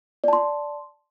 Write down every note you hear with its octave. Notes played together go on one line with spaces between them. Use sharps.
D5 A5 C6